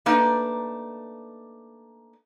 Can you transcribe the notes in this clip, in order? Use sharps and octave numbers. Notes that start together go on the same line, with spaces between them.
A3 A#3 D4 D#4 B4